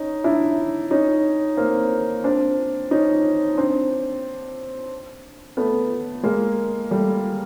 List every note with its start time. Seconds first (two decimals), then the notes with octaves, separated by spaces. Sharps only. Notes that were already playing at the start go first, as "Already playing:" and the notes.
Already playing: C#4 D#4
0.24 D4 E4
0.91 C#4 D#4
1.57 A#3 C4
2.24 C4 D4
2.91 C#4 D#4
3.58 C4 D4
5.57 A3 B3
6.23 G#3 A#3
6.91 G3 A3